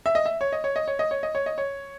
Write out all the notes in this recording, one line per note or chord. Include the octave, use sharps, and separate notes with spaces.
E5
D#5
E5
C#5
D#5
C#5
D#5
C#5
D#5
C#5
D#5
C#5
D#5
C#5